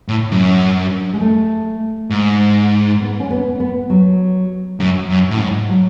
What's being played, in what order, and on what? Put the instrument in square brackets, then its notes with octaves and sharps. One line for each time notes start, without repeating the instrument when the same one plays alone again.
[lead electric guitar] A2
F#2
[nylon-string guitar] G#3
A3
[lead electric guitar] G#2
[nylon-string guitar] B3
C#4
B3
B3
F#3
[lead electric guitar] F#2
F#2
A2
G#2
[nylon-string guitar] F#3